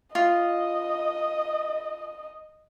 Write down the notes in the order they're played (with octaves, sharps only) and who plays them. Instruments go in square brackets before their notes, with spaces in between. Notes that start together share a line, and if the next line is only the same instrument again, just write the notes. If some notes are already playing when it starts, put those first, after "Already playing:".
[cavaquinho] F4 [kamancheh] D#5